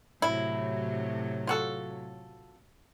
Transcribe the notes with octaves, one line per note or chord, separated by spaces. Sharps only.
A2 C3 F#3 E4
F4 F#4 A4